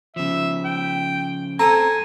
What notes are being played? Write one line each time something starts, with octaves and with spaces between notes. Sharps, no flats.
C#3 F3 E5
G5
C4 A4 G#5 A#5 D#6